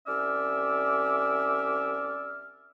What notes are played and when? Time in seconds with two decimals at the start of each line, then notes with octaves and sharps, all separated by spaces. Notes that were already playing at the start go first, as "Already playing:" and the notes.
0.07 C2 C#4 D5 E5 D6 F6